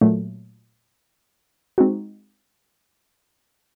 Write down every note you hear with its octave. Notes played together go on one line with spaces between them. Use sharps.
A#2 F#3 A3
G#3 C4 D#4 F#4